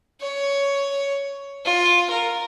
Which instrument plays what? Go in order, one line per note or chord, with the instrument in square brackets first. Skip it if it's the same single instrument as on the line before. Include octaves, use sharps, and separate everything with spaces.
[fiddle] C#5
F4
A#4